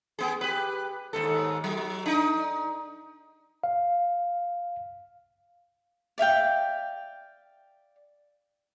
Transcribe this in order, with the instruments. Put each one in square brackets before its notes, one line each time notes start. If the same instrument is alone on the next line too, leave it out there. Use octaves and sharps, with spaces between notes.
[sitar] B3 G#4
G4 B4
D#2 G#2 A4
F#3
D4 D#4
[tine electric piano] F5
[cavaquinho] D5 E5 F5 G5